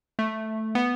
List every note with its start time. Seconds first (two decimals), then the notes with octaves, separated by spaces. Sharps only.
0.19 A3
0.75 B3